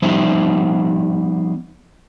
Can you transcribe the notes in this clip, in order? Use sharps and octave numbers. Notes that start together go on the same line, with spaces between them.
F3 G3 B3 D#4 C5 E5